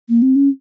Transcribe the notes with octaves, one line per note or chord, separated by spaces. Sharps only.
A#3
C4
C#4